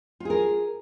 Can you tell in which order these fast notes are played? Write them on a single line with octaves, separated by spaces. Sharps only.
F4 G#4 A#4